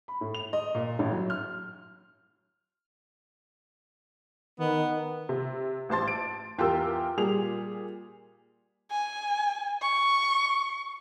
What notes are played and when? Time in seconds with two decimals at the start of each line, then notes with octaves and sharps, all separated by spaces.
0.08 B5
0.21 A2
0.34 F7
0.53 D#5
0.75 A#2
0.99 A1
1.11 F#3
1.30 F6
4.60 D#3 B3
5.29 C3
5.89 A1 C5 A5 C6 A6
6.08 D7
6.58 E2 F4 G4 A#4 G5 E6
7.17 A#2 G3 G#4 F7
8.91 G#5
9.82 C#6